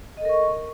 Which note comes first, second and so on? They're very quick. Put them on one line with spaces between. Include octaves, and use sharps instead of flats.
D#5 A4 A#4 C#6